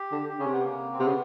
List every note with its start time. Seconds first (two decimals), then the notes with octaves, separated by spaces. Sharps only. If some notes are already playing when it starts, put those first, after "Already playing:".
Already playing: G4
0.12 D3
0.29 G4
0.39 C#3 C#4
0.46 C3
0.53 B3
0.64 A#3
0.93 C4
0.99 C3 B3
1.08 C#3